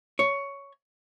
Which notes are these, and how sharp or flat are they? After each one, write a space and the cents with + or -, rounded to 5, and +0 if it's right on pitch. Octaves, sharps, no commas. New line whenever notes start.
C#5 +10